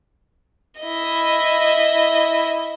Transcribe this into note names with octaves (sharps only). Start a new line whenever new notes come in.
E4 D#5